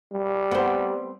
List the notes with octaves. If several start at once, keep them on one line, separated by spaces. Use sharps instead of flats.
G3
B3 C4